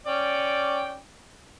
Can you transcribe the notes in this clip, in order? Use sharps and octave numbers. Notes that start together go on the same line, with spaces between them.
C#4 D5 G5